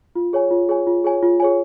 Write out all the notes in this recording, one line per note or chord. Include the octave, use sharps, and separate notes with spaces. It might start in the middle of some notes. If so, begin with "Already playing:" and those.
F4
G#4 C#5 G#5
F4
G#4 C#5 G#5
F4
G#4 C#5 G#5
F4
G#4 C#5 G#5